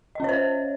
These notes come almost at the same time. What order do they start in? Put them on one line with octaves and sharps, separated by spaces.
D#5 C#4 C#5 C5